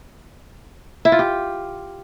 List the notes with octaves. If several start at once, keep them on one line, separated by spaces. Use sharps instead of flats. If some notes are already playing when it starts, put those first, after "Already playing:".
E4
F4
G4